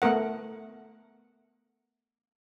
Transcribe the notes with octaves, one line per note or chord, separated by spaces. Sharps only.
A3 B3 A#4 F#5